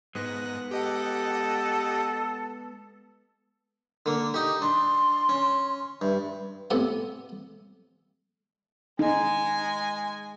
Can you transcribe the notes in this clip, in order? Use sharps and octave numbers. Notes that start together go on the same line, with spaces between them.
G#2 G#3 B3 F#6 A#6
G4 A4 D#5 F#5
D3 A#3
D#4 G4
D4 C6
C#4
G2 E5
A2 C3 B3 G#5
G#3 D#4 G#5